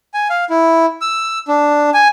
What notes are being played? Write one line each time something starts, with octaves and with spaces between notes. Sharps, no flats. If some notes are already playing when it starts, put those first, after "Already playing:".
G#5
F5
E4
E6
D4
G#5